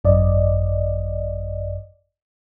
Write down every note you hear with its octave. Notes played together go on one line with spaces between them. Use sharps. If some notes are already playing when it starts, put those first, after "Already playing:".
G#1 F#2 D5 D#5